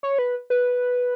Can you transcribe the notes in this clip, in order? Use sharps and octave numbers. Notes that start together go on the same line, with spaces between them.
C#5
B4
B4